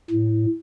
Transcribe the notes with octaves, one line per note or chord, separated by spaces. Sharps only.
A2